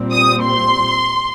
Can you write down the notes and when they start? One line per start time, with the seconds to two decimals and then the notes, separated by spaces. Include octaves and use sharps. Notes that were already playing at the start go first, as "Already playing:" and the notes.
Already playing: A#2 G3 C4
0.12 D#6
0.44 C6